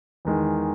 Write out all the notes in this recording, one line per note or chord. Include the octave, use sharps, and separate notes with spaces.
E2 D#3 G#3